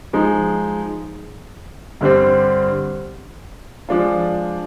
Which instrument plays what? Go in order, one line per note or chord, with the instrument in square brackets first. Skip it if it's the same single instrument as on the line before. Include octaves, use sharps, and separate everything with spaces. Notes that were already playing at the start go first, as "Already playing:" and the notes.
[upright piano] F3 G#3 D#4
G2 D3 G3 C4
F3 G#3 D4 F4